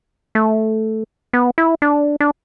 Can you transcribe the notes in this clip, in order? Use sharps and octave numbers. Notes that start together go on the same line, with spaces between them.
A3
B3
E4
D4
D4